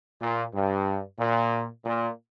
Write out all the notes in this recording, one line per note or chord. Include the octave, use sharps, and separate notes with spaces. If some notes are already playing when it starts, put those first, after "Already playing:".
A#2
G2
A#2
A#2